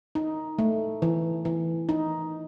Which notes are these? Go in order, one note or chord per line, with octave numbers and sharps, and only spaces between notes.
D#4
A3
E3
E3
D#4